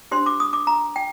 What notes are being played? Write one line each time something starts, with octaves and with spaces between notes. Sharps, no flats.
D4 G4 C5 C6
D6
D#6
D6
A#5
G5